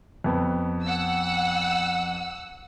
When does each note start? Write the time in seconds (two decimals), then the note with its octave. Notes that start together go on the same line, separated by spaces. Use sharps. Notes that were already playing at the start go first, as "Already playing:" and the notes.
0.24 F2 B3
0.83 F#5 E6